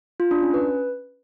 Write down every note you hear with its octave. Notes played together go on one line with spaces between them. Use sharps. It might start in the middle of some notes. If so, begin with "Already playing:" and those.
F4
D4
C#4
B4